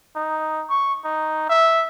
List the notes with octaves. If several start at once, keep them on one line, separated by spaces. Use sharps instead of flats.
D#4
C#6
D#4
E5